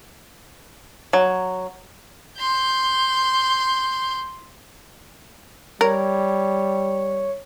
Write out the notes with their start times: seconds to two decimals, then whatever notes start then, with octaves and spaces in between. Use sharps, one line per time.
1.13 F#3
2.39 C6 G6
5.81 G3 A#4 C#5